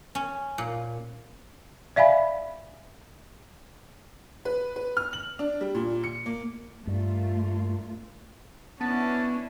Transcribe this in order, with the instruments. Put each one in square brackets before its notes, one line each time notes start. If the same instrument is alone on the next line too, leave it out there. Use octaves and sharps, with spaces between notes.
[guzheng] C#4
A#2
[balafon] D5 E5 F5 G#5 B5
[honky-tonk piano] B4
B4
F6
F#7
D4
G3
A#2
C#7
A#3
[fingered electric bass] G2 [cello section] A3 A#3 F4
[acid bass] B3 [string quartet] C#4 D4 E4 [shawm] A5